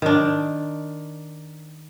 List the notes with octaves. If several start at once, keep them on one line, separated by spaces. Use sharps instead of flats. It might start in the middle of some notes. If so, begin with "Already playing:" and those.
D#3 D4